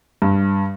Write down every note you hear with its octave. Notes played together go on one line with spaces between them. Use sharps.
G2